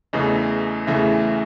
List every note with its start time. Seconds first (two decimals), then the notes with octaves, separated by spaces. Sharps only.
0.13 E2 C#3 E3 A3 D#5
0.87 E2 C#3 E3 A3 E5